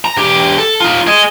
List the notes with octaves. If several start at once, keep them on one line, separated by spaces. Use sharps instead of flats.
A#5
E2 G4
A4
D#4 F4
G#4 D#5